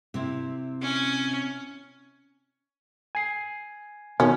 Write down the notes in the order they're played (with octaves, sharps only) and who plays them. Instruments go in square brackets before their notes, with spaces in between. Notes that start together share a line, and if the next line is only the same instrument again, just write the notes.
[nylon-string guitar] C3 C4 E4
[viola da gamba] C#4
[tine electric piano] G#5 C7
[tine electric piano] B2 D#3 [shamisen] C#4